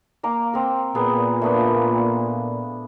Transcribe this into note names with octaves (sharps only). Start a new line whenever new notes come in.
A#3 A#5 D6
C4 A#4
A#2 B3 G#4 A#4
A3 B3 D4